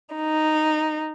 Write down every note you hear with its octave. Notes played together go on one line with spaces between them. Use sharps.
D#4